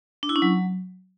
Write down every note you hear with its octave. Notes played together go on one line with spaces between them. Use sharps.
D4
E4
C#4
F#3